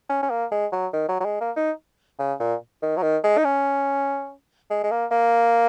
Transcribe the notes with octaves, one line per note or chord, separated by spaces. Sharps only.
C#4
C#4
A#3
G#3
F#3
D#3
F#3
F#3
G#3
A#3
D#4
C#3
A#2
D#3
F#3
D#3
G#3
D#4
C#4
G#3
G#3
A#3
A#3